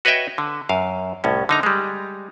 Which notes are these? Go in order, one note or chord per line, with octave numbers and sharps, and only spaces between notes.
F#4 B4 C#5 D#5 E5 G5
D3
F#2 F5
C2 A2 C#4
D3 D#4 A#5
G3 G#3